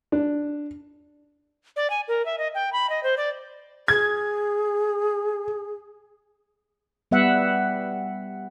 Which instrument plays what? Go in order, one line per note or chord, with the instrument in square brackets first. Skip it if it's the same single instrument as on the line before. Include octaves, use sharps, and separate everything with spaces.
[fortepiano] D4
[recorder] D5
G#5
A#4
E5
D#5
G5
B5
D#5
C5
D5
[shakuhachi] G#4 [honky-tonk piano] G#6
[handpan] G3 B3 E5 F#5